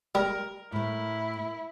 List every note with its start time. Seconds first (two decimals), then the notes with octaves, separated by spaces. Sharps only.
0.15 G3 A#4
0.72 A2 A3 E4